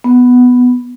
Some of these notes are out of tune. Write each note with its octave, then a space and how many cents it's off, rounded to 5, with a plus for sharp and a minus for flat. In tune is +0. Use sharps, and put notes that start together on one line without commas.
B3 +5